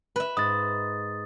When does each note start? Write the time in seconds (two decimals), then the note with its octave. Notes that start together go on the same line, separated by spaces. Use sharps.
0.16 B4 E5
0.37 G#2 D#6 A6